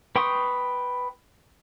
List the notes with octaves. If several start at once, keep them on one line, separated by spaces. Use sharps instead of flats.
B4 G5 C6 C#6 D#6